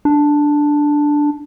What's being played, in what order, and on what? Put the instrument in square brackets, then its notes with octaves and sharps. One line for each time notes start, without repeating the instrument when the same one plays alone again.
[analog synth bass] D4